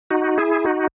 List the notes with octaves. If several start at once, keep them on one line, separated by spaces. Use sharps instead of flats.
D#4 F#4
E4 G#4
D#4 F#4